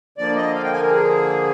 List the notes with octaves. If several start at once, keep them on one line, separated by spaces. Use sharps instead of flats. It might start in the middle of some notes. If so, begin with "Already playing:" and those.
D3 F3 A#3 D5
D#5
F5
G5
G#5
A#4
G#4